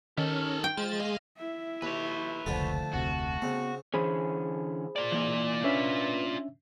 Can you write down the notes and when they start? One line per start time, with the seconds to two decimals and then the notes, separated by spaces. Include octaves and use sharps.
0.17 D#3 C#4 G4 A4
0.64 G5
0.77 G#3 F4 C5 A6
1.00 E2 D#5 F5
1.37 E4 E5
1.82 D#2 B4 C#5
2.46 F1 C#2 D3 F3 A3 A4 A5
2.93 F1 D2 C3 F#4
3.42 C#3 B3 C4
3.94 D3 E3 C#4 G#4 C5 B5
4.96 F4 D5
5.12 E3 A#3
5.64 C#4 D4 B4 E5